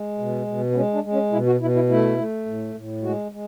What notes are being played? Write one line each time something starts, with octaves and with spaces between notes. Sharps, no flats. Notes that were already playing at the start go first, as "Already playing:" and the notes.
Already playing: G#3
B2
B2
B3
G#3 C#4
D4
G#3
C#4
B2 E4
F#4
B2 E4
E4
A3 E4
A3
A2
A2
G#3 F#4
G#3